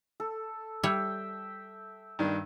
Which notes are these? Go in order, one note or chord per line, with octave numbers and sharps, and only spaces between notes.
A4
G3 C#5 E5 G5
G2 D#3 D4